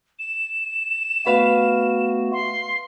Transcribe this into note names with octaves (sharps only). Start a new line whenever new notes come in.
E7
A3 B3 F#4 B4 F5
C6